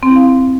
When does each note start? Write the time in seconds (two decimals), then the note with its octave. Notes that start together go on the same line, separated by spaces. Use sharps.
0.03 C4
0.09 E4
0.16 F5